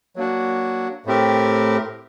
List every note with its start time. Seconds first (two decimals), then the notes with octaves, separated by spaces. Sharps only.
0.16 F#3 A#3 D4 F#4
1.06 A2 A3 C4 G4 A#4